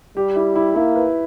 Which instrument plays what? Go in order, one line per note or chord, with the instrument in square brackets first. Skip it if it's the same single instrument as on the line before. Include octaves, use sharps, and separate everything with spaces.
[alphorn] G3 [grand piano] G4
[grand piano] E4
E4
[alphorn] A#3 [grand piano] E4
[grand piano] B4